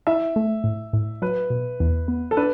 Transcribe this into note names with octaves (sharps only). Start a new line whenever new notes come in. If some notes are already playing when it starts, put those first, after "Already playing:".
E4 E5
A3
A2
A2
F#3 B4
B2
E2
B3
A4
D4 B4